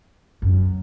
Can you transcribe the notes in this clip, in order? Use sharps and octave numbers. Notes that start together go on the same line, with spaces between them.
F#2